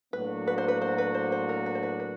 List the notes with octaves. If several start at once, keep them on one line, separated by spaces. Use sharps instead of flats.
A2 F#3 A#3 D4 F#4 B4
B4
C5
B4
C5
B4
C5
C5
A#4
B4
C5
B4
B4